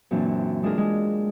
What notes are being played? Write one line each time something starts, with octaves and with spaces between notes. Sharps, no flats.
F#2 A#2 E3 C4 D4
G#3 D4 F4 G#4 A#4
G#3